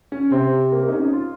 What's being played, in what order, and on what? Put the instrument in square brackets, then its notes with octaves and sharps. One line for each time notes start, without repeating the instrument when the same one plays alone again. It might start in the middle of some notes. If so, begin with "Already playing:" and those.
[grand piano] C#4
[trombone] C3 [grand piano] C4
[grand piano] A#3
A#3
D#4
C#4
D#4
F4